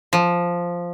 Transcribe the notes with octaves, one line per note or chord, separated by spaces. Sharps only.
F3